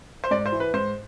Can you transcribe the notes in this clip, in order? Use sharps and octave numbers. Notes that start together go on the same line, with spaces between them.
C5
G#2 D5
C5
E3
B4
G#2 C5